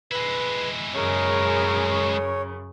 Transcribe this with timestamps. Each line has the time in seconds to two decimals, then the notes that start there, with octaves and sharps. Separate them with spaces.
0.12 G#3 E4 B4
0.94 F#2 C#3 G#4 A#4 C#5